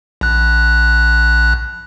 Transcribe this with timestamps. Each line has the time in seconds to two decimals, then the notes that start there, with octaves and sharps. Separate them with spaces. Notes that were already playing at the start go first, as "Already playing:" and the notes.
0.21 A#1 F#6